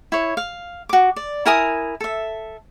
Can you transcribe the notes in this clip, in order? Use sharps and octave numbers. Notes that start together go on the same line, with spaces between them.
E4 C#5
F5
F#4 D6
D5
E4 A#4 G#5 D#6
A4 E5